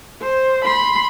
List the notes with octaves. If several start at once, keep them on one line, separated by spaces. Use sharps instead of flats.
C5
B5 C6